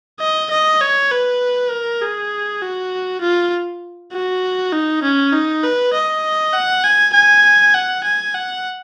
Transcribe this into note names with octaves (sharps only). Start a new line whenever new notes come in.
D#5
D#5
C#5
B4
A#4
G#4
F#4
F4
F#4
D#4
C#4
D#4
B4
D#5
F#5
G#5
G#5
F#5
G#5
F#5